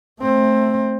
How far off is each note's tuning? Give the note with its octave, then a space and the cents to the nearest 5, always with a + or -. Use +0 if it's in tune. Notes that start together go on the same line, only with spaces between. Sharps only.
A3 +0 C4 +15